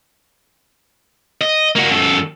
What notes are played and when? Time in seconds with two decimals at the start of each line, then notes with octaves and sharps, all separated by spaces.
1.41 D#5
1.76 A#3 F#4
1.90 F#2 A4